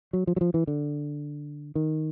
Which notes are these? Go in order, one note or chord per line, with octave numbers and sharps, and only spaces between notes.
F#3
F3
F#3
F3
E3
D3
D#3